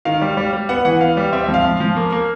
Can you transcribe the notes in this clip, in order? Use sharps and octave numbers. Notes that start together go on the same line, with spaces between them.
D#3 F5
G3
G3
G3
B3 F#5
E3 F#5
B3 F5
G3
C4 E5
E5
F3
F5
F3
F3
A#3
A#3